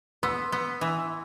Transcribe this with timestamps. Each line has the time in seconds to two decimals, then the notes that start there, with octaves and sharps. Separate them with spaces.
0.23 B3 C6 E6
0.52 B3
0.81 E3